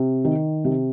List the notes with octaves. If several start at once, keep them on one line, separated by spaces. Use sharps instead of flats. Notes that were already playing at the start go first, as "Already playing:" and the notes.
Already playing: C3
D#3
C3